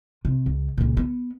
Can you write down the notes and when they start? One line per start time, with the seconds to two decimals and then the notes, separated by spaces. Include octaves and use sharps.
0.25 C3
0.46 C#2
0.78 C#2 A#2
0.97 B3